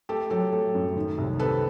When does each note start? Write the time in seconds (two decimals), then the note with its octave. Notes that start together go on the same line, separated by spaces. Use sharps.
0.09 A3 G4 A4
0.30 F#3 G4 A4
0.53 A3
0.75 F#2
0.96 D#3
1.18 C2
1.39 C3 A4 B4